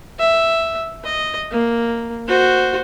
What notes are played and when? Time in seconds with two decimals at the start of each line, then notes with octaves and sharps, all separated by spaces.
0.20 E5
1.04 D#5
1.51 A#3
2.28 F#4 C5